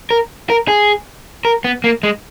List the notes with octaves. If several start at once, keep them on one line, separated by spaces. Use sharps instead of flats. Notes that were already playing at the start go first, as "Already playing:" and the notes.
A#4
A#4
G#4
A#4
B3
A#3
G#3